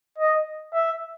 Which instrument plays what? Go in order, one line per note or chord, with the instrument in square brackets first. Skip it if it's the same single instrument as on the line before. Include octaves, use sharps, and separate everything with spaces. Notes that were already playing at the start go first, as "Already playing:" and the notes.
[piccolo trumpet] D#5
E5